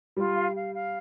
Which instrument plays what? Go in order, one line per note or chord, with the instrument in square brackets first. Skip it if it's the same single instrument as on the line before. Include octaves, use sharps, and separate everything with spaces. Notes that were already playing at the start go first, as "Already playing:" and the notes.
[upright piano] G3 [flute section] F4
[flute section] F5
F5
F5